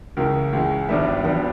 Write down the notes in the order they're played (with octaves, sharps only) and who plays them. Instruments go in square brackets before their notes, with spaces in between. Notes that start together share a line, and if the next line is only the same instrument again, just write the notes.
[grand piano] C#2 C#3 E3 G#3 A#4
C#2 C#3 E3 G#3
G#1 G2 G3 B3 E5
G#1 G2 G3 B3